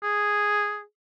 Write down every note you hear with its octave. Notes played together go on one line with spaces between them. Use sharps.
G#4